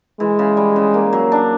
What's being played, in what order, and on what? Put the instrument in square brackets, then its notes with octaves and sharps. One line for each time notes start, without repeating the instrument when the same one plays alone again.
[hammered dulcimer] E3 [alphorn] G#3
[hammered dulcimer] C#3
G3
C#3
A#3
F#3
D4